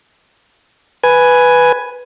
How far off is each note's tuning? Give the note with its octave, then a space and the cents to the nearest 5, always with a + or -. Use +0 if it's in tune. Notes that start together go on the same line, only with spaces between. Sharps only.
B4 +0 G#5 +5